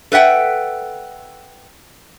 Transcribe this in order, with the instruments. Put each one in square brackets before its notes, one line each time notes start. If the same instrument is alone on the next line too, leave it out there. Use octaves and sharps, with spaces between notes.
[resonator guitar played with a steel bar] A4 B4 E5 F#5 G5